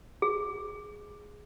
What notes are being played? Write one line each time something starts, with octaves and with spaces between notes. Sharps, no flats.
G#4